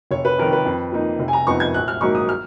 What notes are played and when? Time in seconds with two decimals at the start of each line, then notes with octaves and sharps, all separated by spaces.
0.11 F1 C#5
0.25 B4
0.38 F2 D#3 A#4
0.53 B4
0.65 F2
0.92 F3 A#3 D#4
1.19 F1
1.28 G#5
1.33 A#5
1.46 F2 F3 B3 D#4 C#6
1.60 G#6
1.74 A#1 F#6
1.88 F6
2.01 G#2 F#3 A#3 D#4 C#6
2.15 D#6
2.29 F6